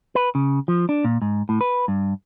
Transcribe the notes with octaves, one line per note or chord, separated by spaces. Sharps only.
B4
C#3
F3
D4
A#2
G#2
A2
B4
G2